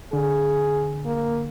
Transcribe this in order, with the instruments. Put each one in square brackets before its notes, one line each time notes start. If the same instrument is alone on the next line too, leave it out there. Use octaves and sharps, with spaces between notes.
[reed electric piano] D3 [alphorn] G#4
[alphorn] A#3